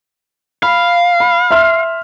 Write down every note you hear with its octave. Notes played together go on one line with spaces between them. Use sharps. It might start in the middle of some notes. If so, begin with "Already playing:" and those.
F5 B5
B5
E5 C6 F6